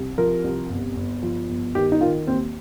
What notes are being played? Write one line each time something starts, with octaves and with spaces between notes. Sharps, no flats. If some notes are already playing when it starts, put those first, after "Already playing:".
Already playing: C2
F3 A#4
C2
G1
G1
F3
G1
D#3 G4
D#4
D#3 F4
D#2 C4